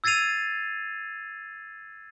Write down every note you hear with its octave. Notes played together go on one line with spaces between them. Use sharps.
E6 G#6 A6 C7 D#7 F7